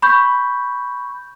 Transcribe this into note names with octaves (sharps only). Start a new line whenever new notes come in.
B5 C#6 G6